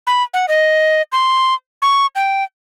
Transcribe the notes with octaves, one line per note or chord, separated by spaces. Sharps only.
B5
F#5
D#5
C6
C#6
G5